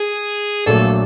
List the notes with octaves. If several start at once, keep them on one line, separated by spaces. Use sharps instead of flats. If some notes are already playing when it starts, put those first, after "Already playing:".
Already playing: G#4
A#1 A#2 F#3 A3 A4